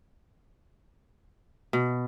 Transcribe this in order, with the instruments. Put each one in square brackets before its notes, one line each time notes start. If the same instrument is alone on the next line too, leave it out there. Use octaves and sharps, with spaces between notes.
[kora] B2